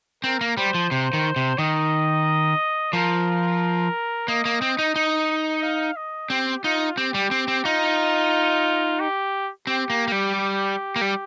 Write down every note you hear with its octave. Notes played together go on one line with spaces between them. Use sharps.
C4 A#4
A#3
G3 C5
F3
C3 C5
D#3
C3
D#3 D#5
F3 A#4
A#3 D#5
A#3
C4
D#4
D#4
F5
D#5
C4 G4
D#4 F4
C4 G4
G3
C4
C4
D#4 F4
G4
C4 G4
A#3
A#3
G3
G4
A#3
G3